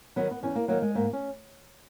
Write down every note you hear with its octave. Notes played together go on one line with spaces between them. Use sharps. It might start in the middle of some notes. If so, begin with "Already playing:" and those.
D#3 F#3 B3
B3
E2 C#4
A#3
D#3 F#3 A#3
G#3
G#2 A#3
C#4